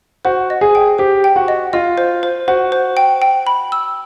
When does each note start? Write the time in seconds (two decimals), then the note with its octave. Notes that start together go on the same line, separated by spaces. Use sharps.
0.25 F#4 C5
0.50 D#5
0.61 G#4
0.75 G5
0.98 G4 C5
1.24 G5
1.36 F#4
1.48 D#5
1.73 F4 D#5
1.98 C5
2.23 C5
2.48 F#4 C5
2.72 C5
2.97 G5
3.22 G5
3.47 B5
3.72 E6